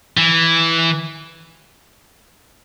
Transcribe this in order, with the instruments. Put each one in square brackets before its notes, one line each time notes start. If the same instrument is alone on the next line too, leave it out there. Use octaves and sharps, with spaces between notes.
[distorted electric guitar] E3